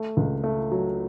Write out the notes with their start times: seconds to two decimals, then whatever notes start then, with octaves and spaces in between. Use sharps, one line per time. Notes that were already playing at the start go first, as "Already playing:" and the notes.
Already playing: A3
0.17 C#2
0.44 A3
0.71 F#3